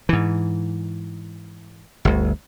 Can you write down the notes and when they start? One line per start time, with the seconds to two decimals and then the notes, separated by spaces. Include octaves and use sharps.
0.09 G#2 E3
2.05 G1 D2